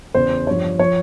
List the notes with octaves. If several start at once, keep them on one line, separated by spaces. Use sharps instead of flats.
E2 C#3 E3 C5
G2 F3 C#5
F3 C#5